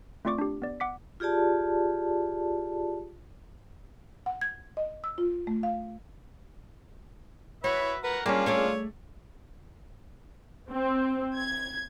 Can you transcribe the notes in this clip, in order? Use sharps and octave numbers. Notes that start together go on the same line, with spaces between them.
A3 C4 F4 D5 C#6 D6
D4 G4
B3 D5
F#5 D6 B6
F4 G4 G#4 D5 A5
F#5
G#6
D#5
E6
F4
A3
F5
F#4 B4 C#5 E5
A#4 B4 F#5
G3 A#3 C#4 D4 F4 G#4
A3 G#4 C#5 D5
C4
G#6